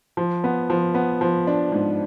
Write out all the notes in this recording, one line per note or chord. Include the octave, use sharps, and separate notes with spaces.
F3
B3
F3
B3
F3
D4
G#2